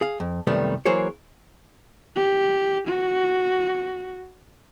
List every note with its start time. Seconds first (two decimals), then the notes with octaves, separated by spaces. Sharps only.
0.01 G#4 F5
0.20 F2
0.47 C2 F#2 D#3 G3 A3 B3
0.85 E3 F#3 A#3 G#4 C5 C#5
2.16 G4
2.88 F#4